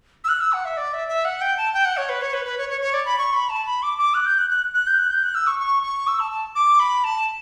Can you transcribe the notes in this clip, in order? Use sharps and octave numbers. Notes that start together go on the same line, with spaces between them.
E6
F#6
E6
F#5
E5
D5
E5
E5
F#5
G5
A5
G5
F#5
C#5
B4
C#5
B4
B4
C#5
C#5
C#5
D5
B5
C#6
B5
A5
B5
D6
D6
F#6
G6
F#6
F#6
F#6
G6
F#6
G6
F#6
E6
C#6
C#6
C#6
E6
A5
A5
D6
B5
A5